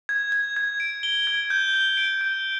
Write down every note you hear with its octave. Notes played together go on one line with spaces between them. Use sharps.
G#6
G#6
G#6
D7
G7
G#6
G6
G7
D7
G6